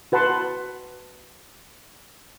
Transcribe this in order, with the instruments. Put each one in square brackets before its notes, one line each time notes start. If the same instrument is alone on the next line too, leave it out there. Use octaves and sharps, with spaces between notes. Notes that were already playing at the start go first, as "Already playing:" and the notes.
[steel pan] F#4 B4 F#5 A5 C6